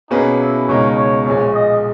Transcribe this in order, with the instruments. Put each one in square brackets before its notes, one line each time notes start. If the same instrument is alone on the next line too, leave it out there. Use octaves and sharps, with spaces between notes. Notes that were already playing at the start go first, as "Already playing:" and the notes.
[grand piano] B2 A#3 C#4 G#4 B4 [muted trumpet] D#4
[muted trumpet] E4
[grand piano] C#2 B2 G#3 D#4 A#4 [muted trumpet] C#5
[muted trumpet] C#5
[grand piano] A#1 A#2 G#3 [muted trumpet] C#5
[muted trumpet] D#5